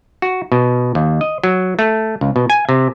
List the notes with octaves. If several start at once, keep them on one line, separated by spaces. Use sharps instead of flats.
F#4
B2
D#2
D#5
F#3
A3
C#2
B2
G#5
C3